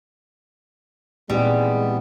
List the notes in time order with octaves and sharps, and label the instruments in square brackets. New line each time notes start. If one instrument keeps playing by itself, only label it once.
[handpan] A#2 C4 D#4 [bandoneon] E3 B3 [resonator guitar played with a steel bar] G3 [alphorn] G#3